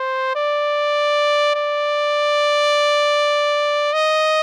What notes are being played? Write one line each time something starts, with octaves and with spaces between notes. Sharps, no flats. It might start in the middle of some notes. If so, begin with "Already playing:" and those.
Already playing: C5
D5
D5
D#5